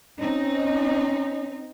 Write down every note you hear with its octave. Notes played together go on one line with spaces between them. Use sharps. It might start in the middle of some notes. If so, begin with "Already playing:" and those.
C4 C#4 D#4